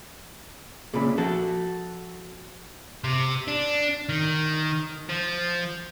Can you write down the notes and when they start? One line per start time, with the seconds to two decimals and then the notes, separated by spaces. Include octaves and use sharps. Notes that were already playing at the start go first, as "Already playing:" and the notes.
0.94 A#2 C#3 G#4 B5
1.18 F3 F#4 A4
3.04 C3
3.48 D4
4.09 D#3
5.09 F3